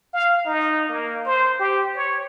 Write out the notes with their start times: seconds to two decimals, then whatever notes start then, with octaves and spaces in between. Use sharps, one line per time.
0.14 F5
0.46 D#4
0.89 A#3
1.25 C5
1.59 G4
1.96 C#5